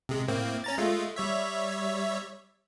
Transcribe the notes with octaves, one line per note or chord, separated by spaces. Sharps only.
C3 G#3
A2 A#3 C4
C#4 A#5 A6
G#3 A3 F4
G3 C#5 E5